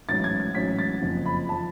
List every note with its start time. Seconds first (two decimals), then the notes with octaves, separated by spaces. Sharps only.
0.09 A1 G#2 F#3 C#4 A6
0.24 G#6
0.40 G#6
0.55 A1 G#2 F#3 C#4 B6
0.79 A6
1.02 F#1 F2 F3
1.26 B5
1.49 F3 A5